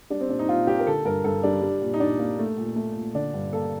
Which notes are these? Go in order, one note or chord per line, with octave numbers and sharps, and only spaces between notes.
G3 D4
C4
A#2 D4
D#4
A#2 F4
A#3 G4
A#4
D3 A4
G2 A#4
G2 A4
G3 D4
G3
A#2
D#4
A#2 D4
A#3
A3
A#2
A3
A#2
D3 D4
G2
A#3 A4